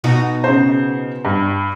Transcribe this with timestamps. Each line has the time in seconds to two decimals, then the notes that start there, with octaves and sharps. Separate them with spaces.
0.04 B2 D#4 F#4
0.44 C#3 C5
1.25 G2